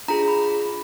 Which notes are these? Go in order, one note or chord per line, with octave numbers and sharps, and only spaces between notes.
D4 F4 G#4 A#5
B5